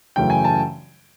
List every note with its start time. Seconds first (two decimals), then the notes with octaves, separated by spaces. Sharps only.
0.16 F#2 C#3 E3 A3 C#4 G5
0.30 G#5
0.44 A5